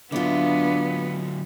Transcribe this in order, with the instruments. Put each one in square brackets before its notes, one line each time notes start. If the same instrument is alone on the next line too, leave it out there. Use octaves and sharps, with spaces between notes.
[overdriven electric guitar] D3 F#3 [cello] B3 [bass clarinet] D4 [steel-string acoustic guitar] E4 F4